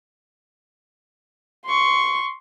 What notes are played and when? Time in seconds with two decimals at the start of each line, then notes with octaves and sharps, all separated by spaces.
1.66 C6 C#6